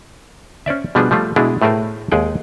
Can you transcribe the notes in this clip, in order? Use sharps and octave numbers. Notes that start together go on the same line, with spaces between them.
C#4 C5 D5 E5
B2 F3 G3 B3 D4 G#4
F3 G3 A3 F4
B2 G#3 D4 E4 G#4
A2 A3 G#4 A#4 C5
D#2 G#3 G#4 F#5 G5